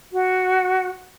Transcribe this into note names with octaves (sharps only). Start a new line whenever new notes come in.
F#4